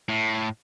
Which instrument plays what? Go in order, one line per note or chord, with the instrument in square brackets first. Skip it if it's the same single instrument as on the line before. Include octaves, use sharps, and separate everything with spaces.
[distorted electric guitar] A2